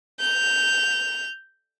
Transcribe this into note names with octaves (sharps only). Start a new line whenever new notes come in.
G6 F7